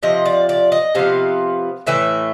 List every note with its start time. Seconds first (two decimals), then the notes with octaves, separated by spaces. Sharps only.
0.03 C3 F3 D#5
0.26 D5
0.49 D5
0.72 D#5
0.95 C3 F3 B3 F5
1.87 A2 E3 A3 E5